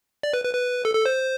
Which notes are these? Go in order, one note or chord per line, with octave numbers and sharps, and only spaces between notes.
D5
B4
B4
B4
A4
A4
C5